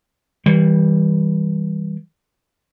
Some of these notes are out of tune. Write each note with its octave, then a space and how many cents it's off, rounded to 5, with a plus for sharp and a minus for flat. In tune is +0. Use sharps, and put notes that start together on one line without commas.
E3 -35 G3 +0